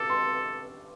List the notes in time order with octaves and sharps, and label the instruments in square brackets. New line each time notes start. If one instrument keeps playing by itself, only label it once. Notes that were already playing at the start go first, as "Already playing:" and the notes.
Already playing: [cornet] A4 [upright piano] D6
[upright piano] C6